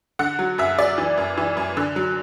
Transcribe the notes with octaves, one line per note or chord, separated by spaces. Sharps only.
D3 F#5
F#3
F#2 E5
F#2 D5
E3
F#2
E3
F#2
D3
F#3